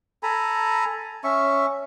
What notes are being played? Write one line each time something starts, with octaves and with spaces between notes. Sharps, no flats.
A4 G#5 A#5 B5
C#4 E5 C#6